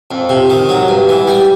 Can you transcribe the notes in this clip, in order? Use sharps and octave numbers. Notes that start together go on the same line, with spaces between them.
F2
C3
D#3
F#3
G2
E3
G3